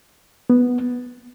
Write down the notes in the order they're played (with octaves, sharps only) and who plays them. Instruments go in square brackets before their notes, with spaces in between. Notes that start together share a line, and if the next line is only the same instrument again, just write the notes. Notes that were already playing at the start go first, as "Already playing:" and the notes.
[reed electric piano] B3